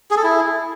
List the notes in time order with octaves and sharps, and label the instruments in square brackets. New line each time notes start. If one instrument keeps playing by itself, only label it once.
[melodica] G#4
A4
E4